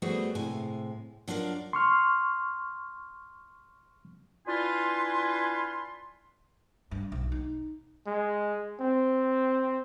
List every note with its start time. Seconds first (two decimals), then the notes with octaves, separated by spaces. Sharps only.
0.02 G3 A3 B3 C4 F#4 G#4
0.35 A2 C3 G#3 G#5
1.28 F#3 D4 F4 A#4 D5
1.73 C6 C#6 F6
4.47 D4 E4 F4 B4 G#5 C6
6.91 G2
7.12 B1
7.32 D#4
8.07 G#3
8.81 C4